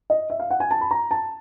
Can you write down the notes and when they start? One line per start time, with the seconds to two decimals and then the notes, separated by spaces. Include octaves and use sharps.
0.10 D#5
0.30 E5
0.40 F5
0.50 F#5
0.60 G#5
0.71 A5
0.81 B5
0.91 A#5
1.11 A5